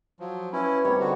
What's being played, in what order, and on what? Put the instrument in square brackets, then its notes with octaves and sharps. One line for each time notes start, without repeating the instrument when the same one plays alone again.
[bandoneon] F3 F#3
[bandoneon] C#4 E4 [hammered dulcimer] B4
[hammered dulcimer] C3 D#3 G3 [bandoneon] C#5
[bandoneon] D3 F#4